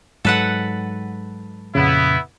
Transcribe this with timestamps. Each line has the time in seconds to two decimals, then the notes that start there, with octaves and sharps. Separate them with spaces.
0.25 G#2 F#3 A4 B4 F#5
1.75 F2 A#2 C#3 B3 E4